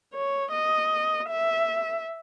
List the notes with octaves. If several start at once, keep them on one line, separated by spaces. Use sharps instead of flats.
C#5
D#5
E5